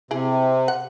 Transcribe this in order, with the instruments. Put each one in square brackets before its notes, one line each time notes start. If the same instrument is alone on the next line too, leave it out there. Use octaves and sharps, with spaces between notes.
[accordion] C3 [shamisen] E4 G#4
[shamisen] F#5